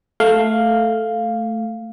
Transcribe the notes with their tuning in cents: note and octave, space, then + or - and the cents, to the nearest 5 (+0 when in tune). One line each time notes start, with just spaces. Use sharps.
A3 +0 F5 +0